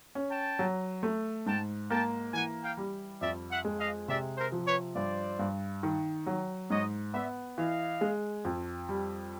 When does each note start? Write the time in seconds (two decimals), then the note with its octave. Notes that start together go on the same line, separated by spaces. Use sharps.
0.15 C#4
0.30 G5 A5
0.59 F#3
1.03 A3
1.46 G#2 G5 A5
1.89 A#3 G5 A5
2.33 E3 F#5 G#5
2.63 F5 G5
2.77 G3
3.21 F2 D5 E5
3.50 E5 F#5
3.65 G#3
3.80 D#5 F5
4.08 C3 D5 E5
4.37 A#4 C5
4.52 F3
4.67 B4 C#5
4.95 G2 C5 D5
5.39 G2
5.83 D#3
6.27 F#3
6.70 G#2 C#5 D#5
7.13 B3 D5 E5
7.57 E3 D#5 F5
8.01 G#3
8.45 F2
8.89 G3